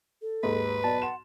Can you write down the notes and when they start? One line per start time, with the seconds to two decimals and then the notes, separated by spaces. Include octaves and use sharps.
0.22 A4
0.43 D#2 G#2 B4
0.84 B1 D5 A5
1.02 F#5 C6 E7